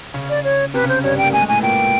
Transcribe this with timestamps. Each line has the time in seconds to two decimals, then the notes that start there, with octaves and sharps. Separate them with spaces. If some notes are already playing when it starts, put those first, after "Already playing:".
0.14 C#3 C#4
0.30 D5
0.44 C#5
0.74 C3 C4 B4
0.84 C#3 C#4
0.89 C5
1.04 G2 G3 C#5
1.18 G5
1.23 A#3
1.32 A3 G#5
1.41 G#3
1.48 A2 A3 G#5
1.59 B3
1.63 A#2 A#3 G5